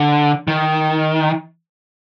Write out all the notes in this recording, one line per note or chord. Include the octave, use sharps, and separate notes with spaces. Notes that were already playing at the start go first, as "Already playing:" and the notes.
Already playing: D3
D#3